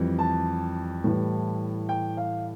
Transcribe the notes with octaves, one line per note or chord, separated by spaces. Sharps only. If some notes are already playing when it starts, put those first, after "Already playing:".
Already playing: F2 E3 G3
A5
A2 E3 G3
G5
F5